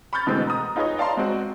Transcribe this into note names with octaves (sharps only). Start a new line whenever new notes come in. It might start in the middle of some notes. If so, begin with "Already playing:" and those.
B5 C#6 F6 G6 A6
B2 D3 E3 G#3 A3 C4
A#5 D#6
D#4 F4 G#4 B4 C#5 D#5
D5 F5 A5 A#5 C6
G#3 C4 F#4